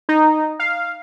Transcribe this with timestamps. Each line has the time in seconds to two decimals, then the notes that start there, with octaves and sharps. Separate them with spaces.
0.09 D#4
0.60 F5